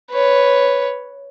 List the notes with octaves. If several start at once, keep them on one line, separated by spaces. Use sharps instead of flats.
B4 C#5